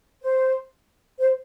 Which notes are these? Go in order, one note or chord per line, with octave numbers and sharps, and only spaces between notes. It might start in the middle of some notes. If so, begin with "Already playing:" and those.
C5
C5